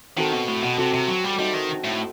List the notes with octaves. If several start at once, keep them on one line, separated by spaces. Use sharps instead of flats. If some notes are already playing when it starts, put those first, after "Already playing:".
D#3 C4 F#4 A4
B2
A2
B2
C3 C4 F#4 A4
C3
F#3
G3
G3 D#4 F#4 C5 E5
D#3
A2